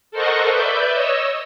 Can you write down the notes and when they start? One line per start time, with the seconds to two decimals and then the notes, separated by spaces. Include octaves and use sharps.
0.11 A4 A#4 C5 D#5 F#5 C#6
0.50 B4 D5 E5 G6
0.92 C#5 D#5 E6